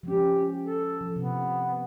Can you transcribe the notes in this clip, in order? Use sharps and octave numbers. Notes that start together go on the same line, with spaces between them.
F3 G#3 C#4 G4
A4
F3
C3 B3